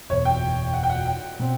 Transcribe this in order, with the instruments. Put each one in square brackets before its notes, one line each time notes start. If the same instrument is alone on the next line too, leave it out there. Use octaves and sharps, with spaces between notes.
[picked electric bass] F#1 E2 B2 [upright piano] C#5
[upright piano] G5
F#5
G5
F#5
G5
[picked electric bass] B2 G3 C4